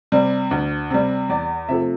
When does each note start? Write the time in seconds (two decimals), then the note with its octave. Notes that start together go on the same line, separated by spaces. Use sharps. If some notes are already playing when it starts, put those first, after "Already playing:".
0.12 C3 G3
0.51 D2
0.90 C3 G3
1.29 E2 D5
1.69 C3 F3 A3 E5